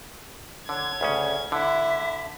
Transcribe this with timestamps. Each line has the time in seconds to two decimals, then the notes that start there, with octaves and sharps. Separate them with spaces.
0.69 D3 C#5 G#6
1.01 D2 C#3 C#4
1.52 D3 E4 E5